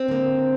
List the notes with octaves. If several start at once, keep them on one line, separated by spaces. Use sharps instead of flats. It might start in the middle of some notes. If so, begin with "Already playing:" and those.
Already playing: C4
D3 A#3